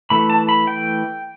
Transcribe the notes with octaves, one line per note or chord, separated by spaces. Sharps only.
E3 A3 B5
A5
B5
G5